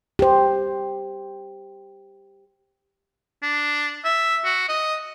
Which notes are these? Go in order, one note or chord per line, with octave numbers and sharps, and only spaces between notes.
G4 C5
D4
E5
F#4
D#5